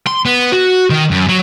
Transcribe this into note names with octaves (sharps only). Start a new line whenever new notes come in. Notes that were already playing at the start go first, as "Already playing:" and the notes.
C6
B3
F#4
D#3
F#2
F#3